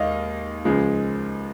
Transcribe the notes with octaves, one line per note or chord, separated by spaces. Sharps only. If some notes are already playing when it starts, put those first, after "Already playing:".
Already playing: D#2 G#3 D#5 F5
C#2 C#3 F3 G#3